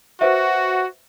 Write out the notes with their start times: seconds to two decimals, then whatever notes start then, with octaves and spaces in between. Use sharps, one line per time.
0.21 F#4 B4 C5 E5